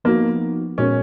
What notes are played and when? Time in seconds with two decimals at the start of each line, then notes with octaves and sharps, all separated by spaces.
0.04 F3 A#3 B3 D#4 F#4
0.78 A#2 G#3 B3 C#4 F#4 A#4